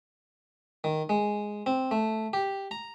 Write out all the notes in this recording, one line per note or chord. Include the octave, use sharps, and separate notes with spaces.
D#3
G#3
C4
A3
G4
A#5